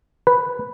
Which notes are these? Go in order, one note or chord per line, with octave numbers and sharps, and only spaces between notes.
B4